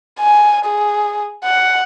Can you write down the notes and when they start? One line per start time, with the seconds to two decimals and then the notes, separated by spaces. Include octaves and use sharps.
0.20 G#5
0.66 G#4
1.44 F#5